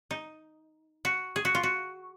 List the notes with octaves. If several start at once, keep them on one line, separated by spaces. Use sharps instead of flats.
D#4
F#4
G#4
F#4
F4
F#4